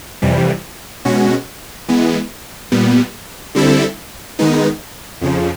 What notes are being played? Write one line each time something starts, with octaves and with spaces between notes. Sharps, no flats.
F2 C3 E3 G3
B2 G#3 C#4 F#4
E3 G#3 B3
A#2 G3 B3
D3 G3 C4 E4 A4
D#3 G#3 B3 D#4
F2 C#3 F3